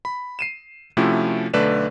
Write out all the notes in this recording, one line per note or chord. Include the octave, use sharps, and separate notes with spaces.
B5
C7 D#7 E7
C3 F3 A3 C#4 E4 F#4
B1 D3 A3 B4 D5 E7